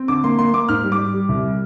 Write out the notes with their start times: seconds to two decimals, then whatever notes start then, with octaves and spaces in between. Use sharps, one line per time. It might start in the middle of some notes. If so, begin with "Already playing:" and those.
Already playing: C4
0.08 D3 D6
0.24 A#3 C6
0.39 A#3 C6
0.53 A#3 D6
0.69 G#2 F6
0.84 G3
0.92 D6
0.99 G3
1.14 G3
1.29 C2
1.44 G3